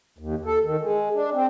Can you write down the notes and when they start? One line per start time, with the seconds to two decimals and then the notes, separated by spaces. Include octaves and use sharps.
0.18 D#2
0.45 A4
0.64 D#3
0.81 G#3
1.14 D4
1.33 C4